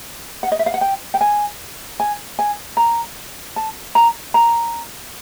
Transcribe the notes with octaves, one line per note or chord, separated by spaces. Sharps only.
F#5
D#5
E5
F5
F#5
G5
G5
G#5
G#5
G#5
A#5
A5
A#5
A#5